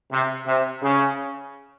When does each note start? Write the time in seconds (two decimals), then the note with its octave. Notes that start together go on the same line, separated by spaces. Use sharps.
0.11 C3
0.46 C3
0.82 C#3